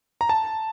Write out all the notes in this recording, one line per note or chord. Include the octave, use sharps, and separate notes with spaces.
A#5
A5